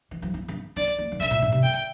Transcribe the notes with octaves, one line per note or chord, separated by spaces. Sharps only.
E3
F3
E4
D4
D4 D5
A#3
E3
D3 E5
A#2
A2
C3
D3 G5